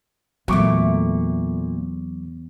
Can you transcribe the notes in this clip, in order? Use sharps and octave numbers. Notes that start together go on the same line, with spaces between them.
E2 A#2 F#3 A3 C#6 D6